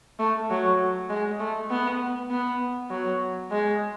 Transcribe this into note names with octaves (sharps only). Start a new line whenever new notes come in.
A3
F#3
G#3
A3
B3
B3
F#3
G#3